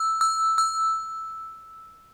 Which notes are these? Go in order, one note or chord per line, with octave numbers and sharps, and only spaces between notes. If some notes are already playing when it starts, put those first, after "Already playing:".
Already playing: E6
E6
E6